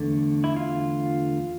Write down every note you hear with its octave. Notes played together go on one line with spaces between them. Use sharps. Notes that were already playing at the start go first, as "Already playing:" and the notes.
Already playing: E2 D3 A3
E4
F4